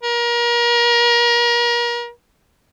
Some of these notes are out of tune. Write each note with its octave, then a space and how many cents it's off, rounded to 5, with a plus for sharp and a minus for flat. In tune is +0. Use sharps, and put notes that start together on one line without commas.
A#4 +35